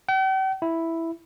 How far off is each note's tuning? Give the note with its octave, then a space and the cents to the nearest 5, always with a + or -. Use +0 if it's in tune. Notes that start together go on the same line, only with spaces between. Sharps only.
G5 -45
E4 +0